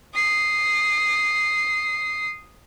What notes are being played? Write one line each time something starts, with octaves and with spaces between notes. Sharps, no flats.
D#6 C7